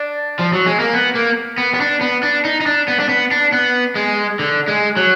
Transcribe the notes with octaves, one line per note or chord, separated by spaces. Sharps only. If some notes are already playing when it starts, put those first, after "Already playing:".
Already playing: D4
F3
F#3
G#3
A#3
B3
A#3
B3
B3
D4
B3
D4
D#4
D#4
D4
B3
D4
B3
D4
B3
G#3
D3
G#3
F#3